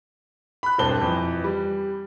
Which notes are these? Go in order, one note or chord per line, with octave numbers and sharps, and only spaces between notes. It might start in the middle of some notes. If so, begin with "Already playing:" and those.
B5 F#6
E1 G2 C4 A5 G7
F2 E3
G3